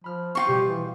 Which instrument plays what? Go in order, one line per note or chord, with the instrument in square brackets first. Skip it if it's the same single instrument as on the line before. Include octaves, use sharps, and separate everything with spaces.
[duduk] F3 [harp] B5 F6
[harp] C4 F5 [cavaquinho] F4 F#4 C#6
[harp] B2 G3 [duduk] G4
[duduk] E3